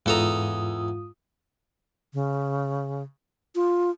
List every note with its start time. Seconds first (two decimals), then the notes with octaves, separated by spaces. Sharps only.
0.06 E2 G#2 F4 A4 A#5 D#6
2.14 C#3
3.55 F4